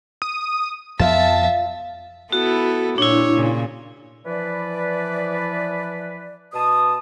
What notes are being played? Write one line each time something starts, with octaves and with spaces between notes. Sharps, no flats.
D#6
F2 F3 B3 F4 E5 F5 A5
B3 E4 F#4 A4
A#2 D4 E4 C#5
A#2 C#3
E3 F3 B4 D5
B2 A5 D#6